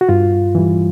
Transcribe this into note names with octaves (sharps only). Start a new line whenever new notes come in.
F#4
G2 F4
E3 G3